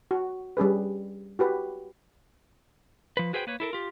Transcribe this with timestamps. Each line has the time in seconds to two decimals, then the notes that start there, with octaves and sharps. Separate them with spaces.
0.11 F#4
0.57 G3 C#4 G#4 B4
1.39 F#4 G4 B4
3.17 F3 B4
3.33 F#4 G#4 B4 C5 E5 G5
3.47 A#3 B4 C#5
3.60 E4 A4 A#4
3.73 F4 G4